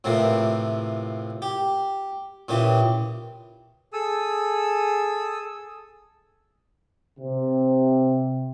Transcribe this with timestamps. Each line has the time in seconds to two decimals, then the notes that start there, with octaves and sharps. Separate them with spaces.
0.04 A2 C3 E3 F3 A#3
1.42 G4
2.49 A#2 C#3 E3 G4
3.93 G#4 A4 D#6 E6
7.19 C3